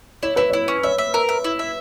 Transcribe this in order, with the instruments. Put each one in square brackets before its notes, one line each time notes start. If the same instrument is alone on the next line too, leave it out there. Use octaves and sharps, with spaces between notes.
[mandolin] E4 [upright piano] C#5
[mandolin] E4 [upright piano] B4
[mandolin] E4 [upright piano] C#5
[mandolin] C#4
[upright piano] C#5 [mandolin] E5
[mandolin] E5
A#4
E5
E4
E5